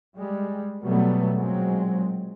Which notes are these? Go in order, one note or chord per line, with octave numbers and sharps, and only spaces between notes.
G3 G#3
B2 F#3 G3 A3 B3
A#2 F#3 G#3 C4